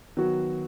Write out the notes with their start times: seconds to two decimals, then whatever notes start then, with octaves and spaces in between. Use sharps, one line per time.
0.17 D#3 F#3 B3 F#4